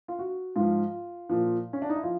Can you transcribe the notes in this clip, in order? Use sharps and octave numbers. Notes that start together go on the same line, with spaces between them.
F4
F#4
G#2 F3 F4
A#2 F3
C#4
D4
D#4
E4
F3 F4